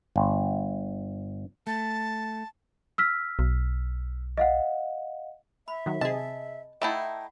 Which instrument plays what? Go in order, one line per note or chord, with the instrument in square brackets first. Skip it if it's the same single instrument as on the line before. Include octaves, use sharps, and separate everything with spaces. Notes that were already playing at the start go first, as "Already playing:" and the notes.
[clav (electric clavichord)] G1
[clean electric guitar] A3 [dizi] A5
[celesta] E6 F6 B6
[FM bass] B1
[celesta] D#5 F5 F#5
[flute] E5 [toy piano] B5
[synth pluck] D#3 F#3
[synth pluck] C3 G#4 [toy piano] D#5 [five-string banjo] A5
[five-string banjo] A3 D#4 E4 [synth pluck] E5 A5 [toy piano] F#5 B5 [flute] G5